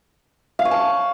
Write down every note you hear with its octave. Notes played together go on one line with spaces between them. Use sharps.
F5
C#5
A5